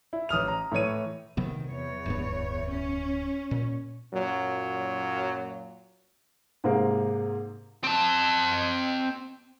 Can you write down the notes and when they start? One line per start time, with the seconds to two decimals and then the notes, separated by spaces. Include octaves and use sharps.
0.13 E4
0.29 A1 D#6 F6 F7
0.48 A#5
0.72 A2 E3 C#5 D#7
1.37 C3 D#3 F#3 B3
1.69 E2 C#5
2.06 D1 G2 B3
2.69 C#4
3.51 A#2
4.14 F#2 A#2 F#3
6.64 G#2 C3 G#3 A#3
7.84 C4 A5